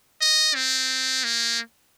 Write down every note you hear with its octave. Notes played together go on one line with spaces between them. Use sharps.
D#5
C4
A#3